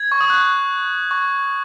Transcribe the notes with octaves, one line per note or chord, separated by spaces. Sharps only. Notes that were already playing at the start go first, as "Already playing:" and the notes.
Already playing: G#6
C#6
D#6
F#6
C#6